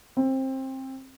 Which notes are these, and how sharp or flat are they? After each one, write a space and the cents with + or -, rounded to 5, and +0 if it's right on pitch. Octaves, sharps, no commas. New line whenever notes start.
C4 +20